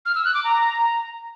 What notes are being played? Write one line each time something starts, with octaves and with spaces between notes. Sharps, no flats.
F6
E6
F#6
D6
A#5